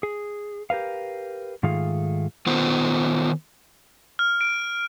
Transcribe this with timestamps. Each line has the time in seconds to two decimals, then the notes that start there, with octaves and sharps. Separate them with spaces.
0.03 G#4
0.70 G4 A#4 B4 F5
1.63 G#2 D#3 A3 F4 G#4 F5
2.47 D#3 B3 F4 C5
4.19 F6
4.41 D7